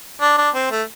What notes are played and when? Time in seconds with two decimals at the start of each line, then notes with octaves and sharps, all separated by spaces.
0.21 D4
0.37 D4
0.54 C4
0.71 A3